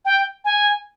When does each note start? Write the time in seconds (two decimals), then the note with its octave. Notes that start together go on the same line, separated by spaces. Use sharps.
0.05 G5
0.45 G#5